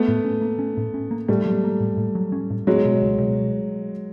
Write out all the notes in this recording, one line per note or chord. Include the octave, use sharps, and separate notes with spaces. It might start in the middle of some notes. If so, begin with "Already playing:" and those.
Already playing: A3 B3
A2
C#4
A#3
C#4
A2
C#4
A#3
A2 G3 A3
F#3
A#3
A2
A2
F#3
C#4
A2
F#3 G#3 B3
B2
C#2
B2